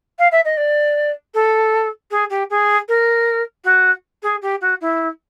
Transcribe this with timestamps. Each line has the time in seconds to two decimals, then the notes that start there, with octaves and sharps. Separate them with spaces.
0.19 F5
0.31 E5
0.45 D#5
0.57 D5
1.34 A4
2.11 G#4
2.30 G4
2.50 G#4
2.88 A#4
3.64 F#4
4.22 G#4
4.42 G4
4.61 F#4
4.81 E4